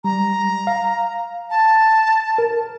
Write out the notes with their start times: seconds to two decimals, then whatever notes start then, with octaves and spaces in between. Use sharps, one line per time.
0.04 G3 A#5
0.67 F5
1.50 A5
2.38 A#4